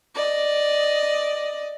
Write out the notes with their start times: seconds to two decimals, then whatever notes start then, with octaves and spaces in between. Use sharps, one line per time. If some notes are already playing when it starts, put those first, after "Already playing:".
0.15 D5 D#5